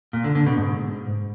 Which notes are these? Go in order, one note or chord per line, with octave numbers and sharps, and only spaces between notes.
A#2
D3
D3
B2
G#2